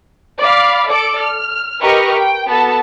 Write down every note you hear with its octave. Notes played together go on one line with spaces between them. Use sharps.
D5 F5 B5
A4 D5 D7
F6
G4 A#4 B4 D#5 C#6 F6
G5
B3 F#4 A4 A5